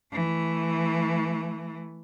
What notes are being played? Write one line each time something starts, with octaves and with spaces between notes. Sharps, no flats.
E3 A3